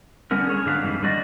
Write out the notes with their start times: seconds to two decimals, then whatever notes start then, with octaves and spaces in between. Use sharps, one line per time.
0.31 D3 G3 B3 C#4 A#4
0.47 G#4 C#5
0.65 G#2 D3 F#3 D4 B4 F5
0.81 F2 G#2 D#3 E3 G3
1.03 D3 G3 A3 F#4 D5 D#5